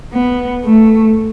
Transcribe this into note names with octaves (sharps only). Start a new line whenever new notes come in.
B3
A3